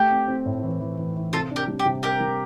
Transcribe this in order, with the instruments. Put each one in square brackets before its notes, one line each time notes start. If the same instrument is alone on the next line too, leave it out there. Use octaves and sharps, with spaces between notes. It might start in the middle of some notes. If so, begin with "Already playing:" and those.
Already playing: [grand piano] A3 [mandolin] G4
[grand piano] C4
C4
A2
E3
E3
E3
E3
[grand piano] C3 [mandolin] F4 A4
[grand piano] D4
[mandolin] G4 A#4
[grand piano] G3
[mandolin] G4
[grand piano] C3
[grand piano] D4 [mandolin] G4 A#4
[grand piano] G3